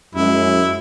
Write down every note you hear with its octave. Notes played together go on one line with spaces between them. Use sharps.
F#2 G#3 E4